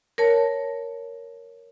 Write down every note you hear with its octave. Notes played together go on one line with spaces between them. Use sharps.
A#4 C#5 A5